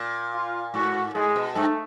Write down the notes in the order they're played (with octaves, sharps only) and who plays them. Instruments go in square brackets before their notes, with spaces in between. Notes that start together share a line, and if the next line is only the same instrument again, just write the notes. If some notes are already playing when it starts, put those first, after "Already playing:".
Already playing: [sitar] A#2
[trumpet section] F4
[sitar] G#2 [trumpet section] F#4
[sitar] G#2 [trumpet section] G#3 G#4
[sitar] B2
[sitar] G2 [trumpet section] A3 A4